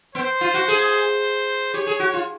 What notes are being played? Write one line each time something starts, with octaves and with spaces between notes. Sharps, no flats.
B3 C5
F4
F#4
G#4
G4 C#5
G#4
F#4
F4